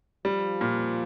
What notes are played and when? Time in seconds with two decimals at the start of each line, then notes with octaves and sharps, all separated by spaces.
0.25 F3 G3
0.61 A#2